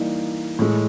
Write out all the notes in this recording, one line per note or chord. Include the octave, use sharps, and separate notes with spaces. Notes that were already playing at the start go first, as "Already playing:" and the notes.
Already playing: E3 G3 A#3 D#4
A2 E3 G#3